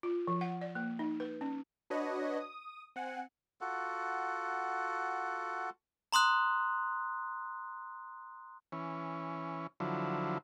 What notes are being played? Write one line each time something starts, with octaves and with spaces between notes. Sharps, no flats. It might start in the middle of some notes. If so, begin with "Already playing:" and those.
F4
F3
F#5
D5
A#3
D#4
B4
C#4
D4 F#4 B4 C#5 D#5
D#6
C4 F#5 G#5
F4 F#4 A4 F#5
A#5 C6 D#6 F#6
E3 C#4
D3 F3 F#3 E4